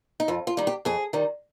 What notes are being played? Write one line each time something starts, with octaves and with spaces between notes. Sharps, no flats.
D#4
F2 F4
F4
D#3 G3
G4
F2 G#4
D#3 G3